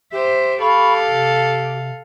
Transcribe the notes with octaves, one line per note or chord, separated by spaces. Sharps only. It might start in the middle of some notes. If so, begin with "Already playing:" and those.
G4 C5 E5
A4 F5 B5 C#6
C3